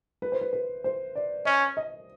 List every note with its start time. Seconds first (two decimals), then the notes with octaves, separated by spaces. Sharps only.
0.22 B4
0.32 C5
0.41 B4
0.53 B4
0.84 C5
1.15 D5
1.45 C#4 D#5
1.77 D#5